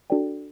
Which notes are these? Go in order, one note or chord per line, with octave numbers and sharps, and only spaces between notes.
D4 F#4 A4 D5 G5